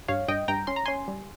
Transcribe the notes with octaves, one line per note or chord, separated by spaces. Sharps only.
G2 C#5 F5
G2 D#5 G5
G2 G5 A#5
C#4 C6
A#5
C#4 G#5 C6
G3